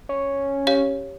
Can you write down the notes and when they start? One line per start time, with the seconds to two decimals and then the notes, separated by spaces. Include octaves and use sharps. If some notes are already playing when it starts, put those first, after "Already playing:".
0.09 C#4
0.67 G4 C#5 F5